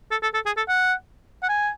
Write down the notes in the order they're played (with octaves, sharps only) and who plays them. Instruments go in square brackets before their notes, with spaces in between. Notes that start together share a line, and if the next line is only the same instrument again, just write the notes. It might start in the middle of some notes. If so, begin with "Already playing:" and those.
[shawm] A4
A4
A4
G#4
A4
F#5
F#5
G#5